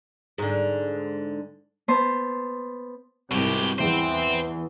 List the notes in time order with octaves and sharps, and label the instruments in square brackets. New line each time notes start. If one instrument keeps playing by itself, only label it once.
[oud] G#2 D3
[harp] B3 C5 A5 C6
[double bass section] C2 G#2 [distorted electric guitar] B2 G4
[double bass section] E2 E3 [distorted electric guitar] C5 G5